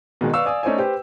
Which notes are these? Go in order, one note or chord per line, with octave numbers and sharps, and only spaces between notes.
B2 D#3 G#3
B4 D5 F5 C#6 E6
D5 F5 G#5 D#6
A3 C#4 D#4 C5 D5 G#5
G4 B4 C5